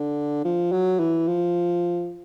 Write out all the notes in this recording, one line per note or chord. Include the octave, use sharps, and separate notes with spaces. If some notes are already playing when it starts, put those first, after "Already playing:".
Already playing: D3
F3
F#3
E3
F3